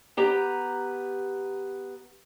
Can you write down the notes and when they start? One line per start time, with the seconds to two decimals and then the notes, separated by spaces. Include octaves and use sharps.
0.17 B3 G4 A#5